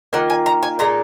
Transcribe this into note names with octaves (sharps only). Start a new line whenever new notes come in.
D#3 A#3 F4 F#5
G#5
A#5
G#5
A#2 G#3 D#4 A#5